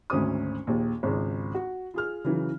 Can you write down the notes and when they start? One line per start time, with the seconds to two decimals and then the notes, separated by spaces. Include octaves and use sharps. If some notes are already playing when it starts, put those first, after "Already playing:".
0.10 G#1 D2 C#4 C5 D#6
0.67 A#1 D#2
1.03 G#1 C#2
1.54 F#4
1.94 F4 G#4 F6
2.25 C#3 E3 F#3